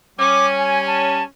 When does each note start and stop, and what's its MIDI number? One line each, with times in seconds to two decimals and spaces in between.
0.19 1.23 55
0.19 1.23 61
0.19 0.46 86
0.59 0.81 80
0.87 1.23 81